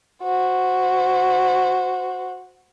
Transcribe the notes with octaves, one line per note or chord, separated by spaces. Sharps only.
F#4 C5